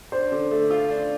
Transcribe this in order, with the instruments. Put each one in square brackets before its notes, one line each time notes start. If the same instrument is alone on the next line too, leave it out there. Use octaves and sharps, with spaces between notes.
[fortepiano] D4 [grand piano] C5
[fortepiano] D3
A3
F4
D4